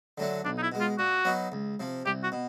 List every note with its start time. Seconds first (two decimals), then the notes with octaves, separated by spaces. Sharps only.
0.18 D3 F#3 A3 D4
0.45 B1 D4
0.58 D#4
0.63 E4
0.72 B2 G#3
0.81 F4
0.98 A#2 F#4
1.25 F#3 B3 D#4
1.52 C#2
1.80 C3 F3
2.06 C2 G4
2.23 F#4
2.32 B2